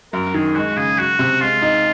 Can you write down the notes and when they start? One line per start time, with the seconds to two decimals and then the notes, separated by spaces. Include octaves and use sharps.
0.13 F#2 A#4
0.34 D#3 G#4
0.55 G#3 F#4
0.76 C#3 G#4
0.98 F#3 F#4
1.19 C3
1.41 G#3 F4
1.62 D#4